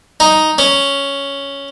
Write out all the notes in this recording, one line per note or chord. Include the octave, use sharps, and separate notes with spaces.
D#4
C#4